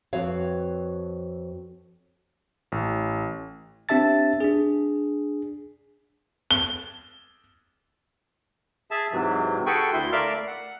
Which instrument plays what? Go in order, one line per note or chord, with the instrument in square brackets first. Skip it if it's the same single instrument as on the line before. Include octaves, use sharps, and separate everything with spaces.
[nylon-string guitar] F2 C4 F#4 B4 C#5 F5
[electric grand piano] A1
[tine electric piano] C4 D4 G4 E5 A5 A6
D4 G#4
[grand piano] G7
[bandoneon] G#4 E5 A5
G#2 C3 E3 F#3
F#4 G#4 A4 B4 G5 C#6
D2 E4 C6
A3 A#4 D5 E5 F5
F#5